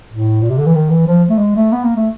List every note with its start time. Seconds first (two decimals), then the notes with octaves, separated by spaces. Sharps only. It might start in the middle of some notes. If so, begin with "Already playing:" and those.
0.10 A2
0.42 A#2
0.50 C3
0.58 D3
0.66 E3
0.75 D#3
0.90 E3
1.07 F3
1.29 A3
1.38 G#3
1.55 A3
1.72 B3
1.84 A#3
1.96 A3